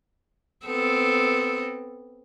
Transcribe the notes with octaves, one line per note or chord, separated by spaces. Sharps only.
B3 C4 A4